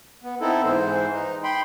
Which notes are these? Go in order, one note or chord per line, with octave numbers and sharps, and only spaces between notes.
B3
B3 C4 D#4 E4 A4
G#2 E3 C5
D#4
G5 B5 C6